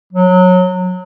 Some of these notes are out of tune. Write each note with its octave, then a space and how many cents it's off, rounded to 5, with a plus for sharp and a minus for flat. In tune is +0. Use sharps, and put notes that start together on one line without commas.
F#3 -20